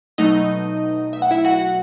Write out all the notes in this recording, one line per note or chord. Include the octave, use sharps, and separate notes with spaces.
B2 F#3 A3 D#4 D#5
E5
F#5
E4 E5
F#4 F#5